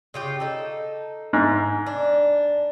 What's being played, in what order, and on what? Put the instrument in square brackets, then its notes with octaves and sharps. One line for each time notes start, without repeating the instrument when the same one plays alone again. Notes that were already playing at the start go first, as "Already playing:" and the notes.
[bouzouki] C#3 F4 G4
D#4 A4
[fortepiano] G#2
[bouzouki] D4